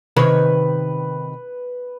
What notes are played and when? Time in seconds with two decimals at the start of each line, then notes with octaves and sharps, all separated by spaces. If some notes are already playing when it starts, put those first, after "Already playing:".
0.16 C3 D#3 B4 C#5